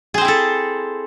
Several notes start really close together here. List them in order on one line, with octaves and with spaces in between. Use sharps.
G#4 C5 C4 E4 A4